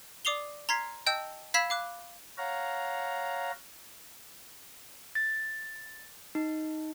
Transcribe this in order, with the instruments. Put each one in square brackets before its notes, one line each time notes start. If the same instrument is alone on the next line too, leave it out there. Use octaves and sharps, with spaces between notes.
[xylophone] D5 D6 D#6 C7 F7 G7
A#5 C6 F6 G#6 B6 C7
D#5 G5 A5 E6 G6
F5 B5 E6 G#6 B6 E7
F5 D6 F#6
[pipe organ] C#5 F5 F#5 A#5
[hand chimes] A6
D#4